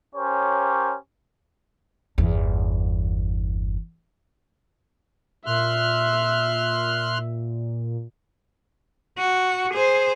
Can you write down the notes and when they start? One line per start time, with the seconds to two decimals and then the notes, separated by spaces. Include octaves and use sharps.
0.15 C#4 G4 A#4 C5 C#5
2.18 G1 E2
5.46 A#2 E5 C6 F6 F#6
9.18 F#4
9.74 G#4 C5